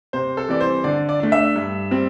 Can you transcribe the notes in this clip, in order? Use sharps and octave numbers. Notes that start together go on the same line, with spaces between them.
C3 C5
A4
E3 G3 C4 D5
C5
D3 D5
D5
A3 D4
E5
G2
G3 C4